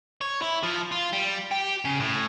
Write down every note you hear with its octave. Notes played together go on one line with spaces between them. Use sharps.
C#5
E4
F3
F4
G3
G4
C#3
A2